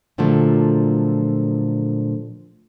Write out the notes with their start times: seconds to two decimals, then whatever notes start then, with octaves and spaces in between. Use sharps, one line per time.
0.18 A#2 D3 F3 F#3 A3